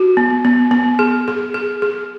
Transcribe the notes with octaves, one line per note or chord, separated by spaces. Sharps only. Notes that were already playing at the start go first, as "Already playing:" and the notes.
Already playing: F#4
B3
B3
B3
G#4
G#4
G#4
G#4